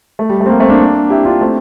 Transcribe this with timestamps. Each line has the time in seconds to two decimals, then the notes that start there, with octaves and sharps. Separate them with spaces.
0.19 A3
0.30 G3
0.40 A3
0.46 C4
0.50 G3 A#3
0.60 A3 C4
0.70 A#3 D4
1.10 E4 G4
1.25 D4 F4
1.41 A3 C4